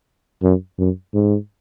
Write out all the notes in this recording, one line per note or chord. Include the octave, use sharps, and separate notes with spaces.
F#2
F#2
G#2